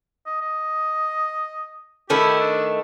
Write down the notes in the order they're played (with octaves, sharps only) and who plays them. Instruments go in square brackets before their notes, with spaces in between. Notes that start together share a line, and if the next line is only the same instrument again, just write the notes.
[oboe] D#5
D#5
[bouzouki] D#3 A3 E4 [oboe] G4
[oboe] D4